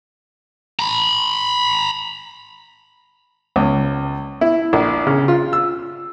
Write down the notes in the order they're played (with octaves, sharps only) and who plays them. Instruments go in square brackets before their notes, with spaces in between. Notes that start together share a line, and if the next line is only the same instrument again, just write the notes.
[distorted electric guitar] A#5 B5
[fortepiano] C#2
E4
A#1
C#3
F4
E6